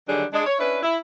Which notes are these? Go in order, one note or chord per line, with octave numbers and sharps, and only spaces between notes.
D3 D#3 F#3 G3 D4 G#4
G#3 D4
C#5
C#4 D4 E4 B4
E4